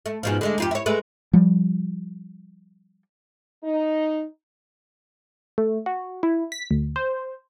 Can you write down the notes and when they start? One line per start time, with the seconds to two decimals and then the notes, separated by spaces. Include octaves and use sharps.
0.06 A3
0.23 G#2 B2 F3
0.41 D3 G#3 A3
0.58 F2 F4 G4
0.71 E4 C#5
0.86 G#3 A3 B4
1.33 F3 G3
3.64 D#4
5.58 A3
5.86 F#4
6.23 E4
6.52 B6
6.71 D2
6.96 C5